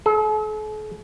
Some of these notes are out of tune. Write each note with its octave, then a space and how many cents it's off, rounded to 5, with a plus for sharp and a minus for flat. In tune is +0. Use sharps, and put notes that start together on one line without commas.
A4 -45